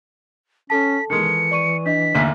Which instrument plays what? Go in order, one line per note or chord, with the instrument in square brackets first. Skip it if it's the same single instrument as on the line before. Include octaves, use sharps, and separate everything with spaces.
[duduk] C#4 [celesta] A4 A5 [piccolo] B6
[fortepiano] D#3 G#3 [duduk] E3 [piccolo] C#7
[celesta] D5 C#6 D#7
[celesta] D4 D#5 [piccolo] B6
[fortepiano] A1 D#2 E5 [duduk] D3